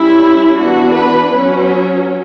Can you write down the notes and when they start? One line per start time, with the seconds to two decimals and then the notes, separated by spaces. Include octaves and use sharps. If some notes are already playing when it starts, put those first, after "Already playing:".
Already playing: G3 C#4 E4
0.57 E3 B3 D4 F#4
0.95 B4
1.33 F#3 C#4